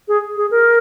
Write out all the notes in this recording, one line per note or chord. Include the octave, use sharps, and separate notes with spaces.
G#4
G#4
A#4